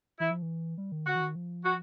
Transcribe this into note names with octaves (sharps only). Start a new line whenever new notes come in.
E3 E4
F3
E3
G3
D#3
D3 F#4
E3
D#3
F3
F#4